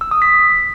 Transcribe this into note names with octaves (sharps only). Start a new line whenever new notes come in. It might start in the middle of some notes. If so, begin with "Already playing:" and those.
E6
D#6
B6